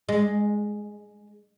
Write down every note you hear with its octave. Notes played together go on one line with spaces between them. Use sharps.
G#3